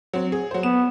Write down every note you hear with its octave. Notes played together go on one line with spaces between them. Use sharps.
F#3 C4
G#4
F#3 C5
B3 E7